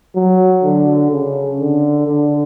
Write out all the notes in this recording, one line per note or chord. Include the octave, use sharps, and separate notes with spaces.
F#3
D3
C#3
D3
D3